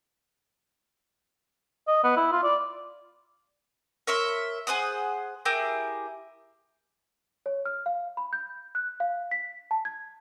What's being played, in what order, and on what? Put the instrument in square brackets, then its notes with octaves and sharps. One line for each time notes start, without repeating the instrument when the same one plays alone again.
[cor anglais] D#5
B3
E4
F4
D5
[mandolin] A#4 C#5 E5 C6
G#4 C5 F#5 D#6
E4 G4 G#4 A#4
[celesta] C#5
F6
F5
B5
G6
F#6
F5
B6
A5
G#6